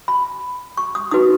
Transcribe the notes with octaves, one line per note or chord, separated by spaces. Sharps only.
B5
C#6
D#6
D#4 F#4 B4 D#6